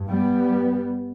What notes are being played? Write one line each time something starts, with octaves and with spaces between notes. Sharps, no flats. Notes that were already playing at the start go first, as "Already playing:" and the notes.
Already playing: G2
G3 B3